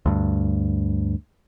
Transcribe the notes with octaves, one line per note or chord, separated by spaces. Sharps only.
D2 G2